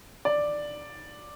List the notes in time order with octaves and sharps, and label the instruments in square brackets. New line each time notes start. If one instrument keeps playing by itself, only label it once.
[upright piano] D5